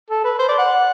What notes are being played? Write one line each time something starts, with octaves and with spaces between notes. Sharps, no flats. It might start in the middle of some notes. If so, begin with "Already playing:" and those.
A4
B4
C5
D5
F#5